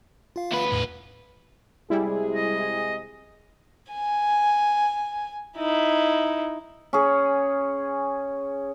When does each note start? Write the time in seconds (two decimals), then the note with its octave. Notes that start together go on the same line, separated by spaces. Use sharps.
0.36 F4 F5
0.52 D2 B4
0.72 E2 A2
1.90 C3 G3 G#3 E4 G#4
2.34 D#5
3.90 G#5
5.57 D#4 E4
6.93 C#4 G#4